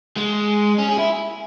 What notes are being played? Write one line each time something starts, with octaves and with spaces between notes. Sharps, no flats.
G#3
C#4
G#4
E4